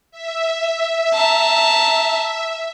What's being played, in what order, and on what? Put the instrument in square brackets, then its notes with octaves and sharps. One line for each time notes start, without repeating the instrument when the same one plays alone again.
[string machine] E5
[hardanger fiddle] A5 A#5